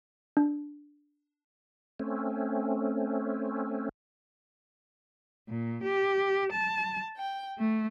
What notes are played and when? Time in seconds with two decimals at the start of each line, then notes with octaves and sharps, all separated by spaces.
0.37 D4
2.00 A3 C4 C#4
5.47 A#2
5.82 G4
6.50 A5
7.16 G5
7.58 A3